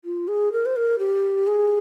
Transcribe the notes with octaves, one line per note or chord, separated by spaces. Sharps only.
F4
G#4
A#4
C5
A#4
G4
G#4